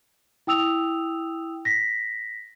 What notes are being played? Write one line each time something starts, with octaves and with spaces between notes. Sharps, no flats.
E4 G5 D#6 E6 F7
A#6 B6